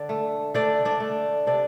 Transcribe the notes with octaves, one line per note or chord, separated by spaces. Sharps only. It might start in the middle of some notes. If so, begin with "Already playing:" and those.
Already playing: D3 D4 D5
A3
A3 D4 D5
D4 D5
A3
C3 D4 D5